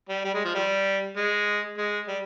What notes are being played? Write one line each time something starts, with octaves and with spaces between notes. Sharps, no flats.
G3
G3
G#3
F3
G3
G#3
G#3
G3